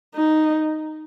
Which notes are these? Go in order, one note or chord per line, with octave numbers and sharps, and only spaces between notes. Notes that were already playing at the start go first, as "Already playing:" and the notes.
D#4